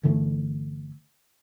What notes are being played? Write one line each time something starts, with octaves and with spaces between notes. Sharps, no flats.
G1 D3 E3 A3